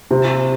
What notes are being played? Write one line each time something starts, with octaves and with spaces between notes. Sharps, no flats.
C3